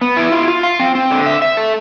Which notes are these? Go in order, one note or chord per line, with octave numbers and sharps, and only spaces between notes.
B3
E4
F4
F4
F5
C4
C4
D3
E5
E5
A4